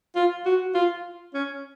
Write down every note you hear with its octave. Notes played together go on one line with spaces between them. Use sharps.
F4
F#4
F4
C#4